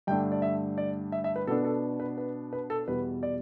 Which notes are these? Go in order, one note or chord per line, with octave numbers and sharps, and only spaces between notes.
G2 D3 A3 D4 G5
D5
E5
D5
E5
E5
B4
B2 B3 D4 A4
A4
B4
B4
B4
A4
E2 B2 G3 B4
D5